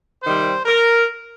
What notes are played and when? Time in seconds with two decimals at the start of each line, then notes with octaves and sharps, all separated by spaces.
0.23 C3 D#3 G3 C5
0.66 A#4